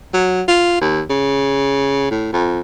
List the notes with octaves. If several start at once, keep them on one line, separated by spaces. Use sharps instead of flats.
F#3
F4
D#2
C#3
A2
F2